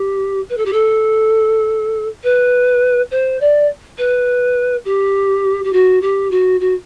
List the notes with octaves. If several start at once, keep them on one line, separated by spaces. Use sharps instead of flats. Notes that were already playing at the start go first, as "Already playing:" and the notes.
Already playing: G4
B4
A4
G4
A4
B4
C5
D5
B4
G4
G4
F#4
G4
F#4
F#4